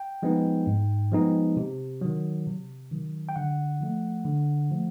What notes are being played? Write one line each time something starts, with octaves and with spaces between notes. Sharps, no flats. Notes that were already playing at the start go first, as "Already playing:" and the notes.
Already playing: G5
F3 G#3 B3 D#4
G#2
F3 G#3 B3 D#4
C3
D#3 F#3
C3
D#3 F#3
G5
D3 F#5
F3 A3
D3
F3 A3